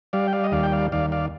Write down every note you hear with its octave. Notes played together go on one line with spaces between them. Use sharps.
G3 D5 F5
G5
D5 F5
D#5
D#2 D5 F5
G5
D5 F5
D#2 D5 F5
D5 F5